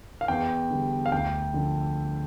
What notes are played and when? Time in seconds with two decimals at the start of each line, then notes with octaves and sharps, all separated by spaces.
0.21 F5
0.28 E2 G5
0.70 D3 G3
1.06 F5
1.12 D2 G5
1.54 D3 F3